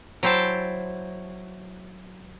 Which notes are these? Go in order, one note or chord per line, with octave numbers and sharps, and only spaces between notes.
F#3 E4 C5 G5 A5